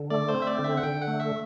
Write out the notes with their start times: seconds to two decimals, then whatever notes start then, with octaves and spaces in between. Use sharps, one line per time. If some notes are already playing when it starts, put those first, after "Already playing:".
Already playing: D3
0.10 A3 D5
0.28 C5
0.35 C4
0.42 E5
0.47 D5
0.59 D3
0.65 E5
0.77 F#5
0.83 D3 G5
1.02 F#5
1.07 A3
1.20 E5